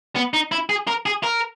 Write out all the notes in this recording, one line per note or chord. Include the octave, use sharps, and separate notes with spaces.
B3
D#4
E4
G#4
A#4
G#4
A#4